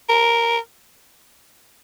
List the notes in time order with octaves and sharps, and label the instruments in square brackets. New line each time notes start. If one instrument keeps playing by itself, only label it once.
[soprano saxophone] A#4